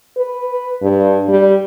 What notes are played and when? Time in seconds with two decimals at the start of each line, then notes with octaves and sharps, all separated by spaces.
0.17 B4
0.82 G2
1.28 G3